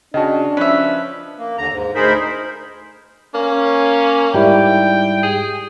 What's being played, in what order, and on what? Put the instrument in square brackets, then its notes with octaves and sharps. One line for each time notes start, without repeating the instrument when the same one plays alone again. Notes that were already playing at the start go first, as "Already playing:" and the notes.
[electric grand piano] C#3 F#4 [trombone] D4 [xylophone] D#5 G5 A5
[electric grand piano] F3 C#4 [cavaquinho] B4 E5
[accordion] A#3
D#2 D3 A#5
G#2
D2 D#4 G#4 A#4 C5 B5
[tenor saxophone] A#3 [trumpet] C#4
[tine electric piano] G#2 G3 E4 [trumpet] G5
[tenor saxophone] G#4